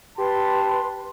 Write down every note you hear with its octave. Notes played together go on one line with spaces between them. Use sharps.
G4 B4 A5 C6